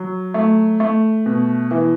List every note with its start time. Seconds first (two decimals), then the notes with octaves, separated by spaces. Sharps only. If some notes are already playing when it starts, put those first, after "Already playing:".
Already playing: F#3
0.34 A3
0.80 A3
1.26 B2
1.71 E3